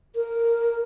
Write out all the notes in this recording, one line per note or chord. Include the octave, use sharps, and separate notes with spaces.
A#4